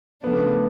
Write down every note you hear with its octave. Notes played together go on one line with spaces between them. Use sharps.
C#3 F3 A3 B3 D4